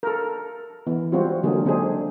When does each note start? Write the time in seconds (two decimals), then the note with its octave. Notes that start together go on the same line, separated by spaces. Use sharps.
0.03 A4 A#4
0.87 E3 B3
1.12 G3 G#3 C4 F4 F#4
1.43 D3 F#3 G#3 A#3 G#4
1.65 D3 C4 D4 D#4 G#4